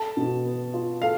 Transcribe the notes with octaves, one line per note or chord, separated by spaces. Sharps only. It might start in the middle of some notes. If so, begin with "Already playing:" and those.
Already playing: A4 A5
B2
B3
F4
A4 F5